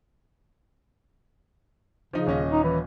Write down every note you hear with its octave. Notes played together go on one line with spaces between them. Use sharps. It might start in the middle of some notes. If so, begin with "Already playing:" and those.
C#3 F3 D#4
D#1 C#4 D#5
D#4
E3